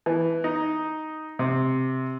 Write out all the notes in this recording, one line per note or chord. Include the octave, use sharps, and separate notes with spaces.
E3
D#4
C3